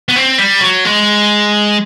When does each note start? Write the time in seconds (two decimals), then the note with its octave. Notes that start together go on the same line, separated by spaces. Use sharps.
0.09 B3
0.16 C4
0.39 G3
0.61 F#3
0.85 G#3